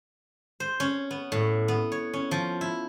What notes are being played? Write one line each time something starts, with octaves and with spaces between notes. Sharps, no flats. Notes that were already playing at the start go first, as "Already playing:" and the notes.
C5
C#4
B3
A2
B3
C#5
C#4
F3
E4